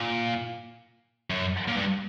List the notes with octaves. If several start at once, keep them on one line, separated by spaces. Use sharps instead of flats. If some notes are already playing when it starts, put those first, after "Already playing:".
Already playing: A#2
F#2
A#2
G2